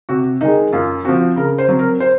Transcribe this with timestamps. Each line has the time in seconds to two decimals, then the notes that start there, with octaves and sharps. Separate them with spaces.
0.09 C3 F#4
0.41 D#3 G#3 D#4
0.72 F#2 F4
1.05 F3 C4 F#4
1.36 C#3 A#4
1.58 C5
1.69 F#3 C4
1.79 A#4
2.00 C5